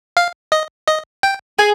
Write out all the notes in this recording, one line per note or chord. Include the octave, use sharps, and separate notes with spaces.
F5
D#5
D#5
G5
G#4 G#5